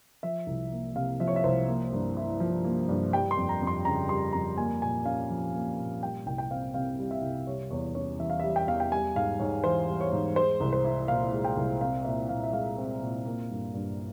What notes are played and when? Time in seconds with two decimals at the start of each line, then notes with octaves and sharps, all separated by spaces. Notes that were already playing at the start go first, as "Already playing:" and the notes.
0.23 F3 E5
0.47 C2
0.72 A#3
0.95 C3 F5
1.20 F3 E5
1.27 C#5
1.36 E5
1.44 C2 C5
1.68 A#3
1.92 G2
2.17 E4
2.40 F3
2.64 A#3
2.89 G2
3.13 G3 G5
3.31 C6
3.37 F2
3.49 A#5
3.62 F2
3.67 C6
3.85 C#3 A#5
4.09 G3 C6
4.33 F2 A#5
4.57 A#3 G#5
4.81 A#2 G#5
5.05 C#4 F5
5.30 F3
5.55 A#3
5.78 A#2
6.02 G3 G5
6.26 C2 G5
6.38 G5
6.51 C4 F5
6.74 C3 F5
6.99 G3
7.11 E5
7.22 C2
7.47 G3 C#5
7.70 E2 C#5
7.95 C#4 C#5
8.19 E3 E5
8.30 F5
8.39 G3 E5
8.56 G5
8.67 E2 F5
8.80 G5
8.92 G3 G#5
9.15 G#2 F5
9.39 G#2 C#5
9.64 E3 C5
9.88 G3
10.00 C#5
10.12 G#2
10.36 G#3 C5
10.60 C2
10.73 C5
10.85 E4
11.08 A#2 F5
11.33 G#3
11.44 G5
11.57 C2
11.81 C4 F5
12.05 A#2 E5
12.29 A#2 F5
12.44 E5
12.53 G#3 F5
12.78 C4
13.02 A#2
13.25 A#3
13.50 G2
13.74 G2